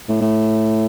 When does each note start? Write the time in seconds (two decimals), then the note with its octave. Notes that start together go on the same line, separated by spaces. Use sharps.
0.09 A2
0.21 A2